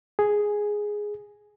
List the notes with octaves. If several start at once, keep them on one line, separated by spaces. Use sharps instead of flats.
G#4